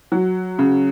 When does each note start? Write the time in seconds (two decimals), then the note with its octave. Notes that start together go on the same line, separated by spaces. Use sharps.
0.12 F#3
0.59 C#3